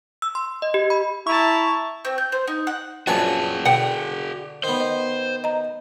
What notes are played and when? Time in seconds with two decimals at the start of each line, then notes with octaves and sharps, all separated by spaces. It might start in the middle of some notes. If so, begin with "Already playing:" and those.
0.22 E6
0.35 C6
0.62 D#5
0.74 G4
0.90 B5
1.27 E4 A5 A#5 C#6
2.05 C4
2.18 G6
2.32 C5
2.47 D#4
2.67 F#5
3.07 A#1 F#2 B3 C#4 D4 F#4 G#4 C#5
3.65 B2 D3 F#5 G5
4.64 D#3 B3 C5
4.80 D#5
5.44 D#5 A#5